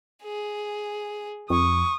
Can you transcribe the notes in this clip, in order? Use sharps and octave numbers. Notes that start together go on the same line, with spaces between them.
G#4
F2 C#6 D#6